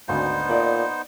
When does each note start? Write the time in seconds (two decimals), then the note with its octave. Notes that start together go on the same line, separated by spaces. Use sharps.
0.08 G#1 D2 B3 D4 D#4 C5
0.49 A#2 D5 D#5